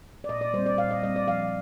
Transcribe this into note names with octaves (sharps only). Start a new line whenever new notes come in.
D5
A#2 D#5
D5
G3 C4 C5
D5
A#2 F5
D#5
G3 C4 D#5
D5
F3 F5